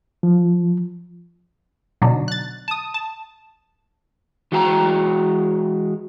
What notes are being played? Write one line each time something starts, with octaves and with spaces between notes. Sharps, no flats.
F3
B2 D3 F#3 D4 D#4
F#6 A6
A5 D#6
A5
E3 G#3 F#4 G5 G#5 A#5